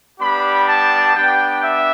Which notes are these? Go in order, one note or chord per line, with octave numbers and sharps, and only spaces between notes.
G3 B3 D4 G4 B5
A5
B3 D4 G4 G5
E5